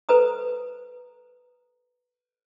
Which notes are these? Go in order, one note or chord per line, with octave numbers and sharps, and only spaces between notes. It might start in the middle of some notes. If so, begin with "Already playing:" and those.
A4 B4 C5 A#5 D#6